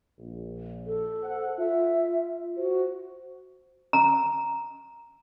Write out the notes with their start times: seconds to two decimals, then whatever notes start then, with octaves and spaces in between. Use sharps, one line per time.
0.19 A#1
0.87 A4
1.23 C5 F#5
1.58 F4 E5
2.56 F#4 C5
3.93 A#5